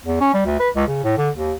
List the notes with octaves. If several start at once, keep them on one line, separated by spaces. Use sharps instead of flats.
E2
C#4
G3
D2
B4
C#2
C#3
A2
D3
D#2